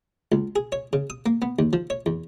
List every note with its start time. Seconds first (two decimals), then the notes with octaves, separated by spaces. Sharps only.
0.32 C#2
0.56 G#4
0.72 C#5
0.93 C#3
1.10 D#6
1.26 A#3
1.42 B3
1.59 D#2
1.73 F3
1.90 C#5
2.06 E2